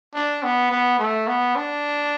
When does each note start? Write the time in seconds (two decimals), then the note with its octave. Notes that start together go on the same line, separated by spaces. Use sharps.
0.14 D4
0.43 B3
0.71 B3
0.99 A3
1.27 B3
1.56 D4